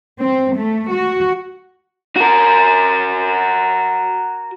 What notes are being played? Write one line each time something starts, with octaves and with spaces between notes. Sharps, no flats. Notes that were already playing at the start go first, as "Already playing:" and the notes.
C4
A3
F#4
F#4 A#4